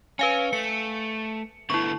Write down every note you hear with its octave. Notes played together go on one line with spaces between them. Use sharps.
C#4 B4 F5 G#5
A3 C#7
D3 A3 B3 E4 C#6